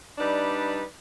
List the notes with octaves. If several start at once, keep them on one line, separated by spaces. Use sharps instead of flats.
G3 D4 D#4 B4 D5